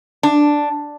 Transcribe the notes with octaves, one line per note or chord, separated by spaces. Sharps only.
D4